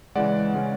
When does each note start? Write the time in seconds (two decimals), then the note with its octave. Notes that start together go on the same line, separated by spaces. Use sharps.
0.15 C#3 E3 G#3 D5 F#5
0.54 C#3 G#3 C#4